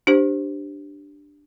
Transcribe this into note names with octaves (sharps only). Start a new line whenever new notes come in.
D4 G4 C5